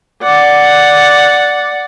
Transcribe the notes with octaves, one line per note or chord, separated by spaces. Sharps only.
D5 F#5